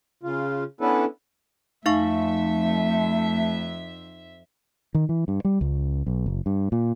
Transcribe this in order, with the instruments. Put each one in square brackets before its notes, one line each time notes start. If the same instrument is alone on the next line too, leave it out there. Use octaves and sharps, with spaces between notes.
[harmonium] C#3 F4
B3 C#4 D4 E4 A4 B4
[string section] F2 E5 [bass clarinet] A3 [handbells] D#4 F5 C#6
[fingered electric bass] D#3
E3
G2
G3
C#2
B1
F#1
G2
A#2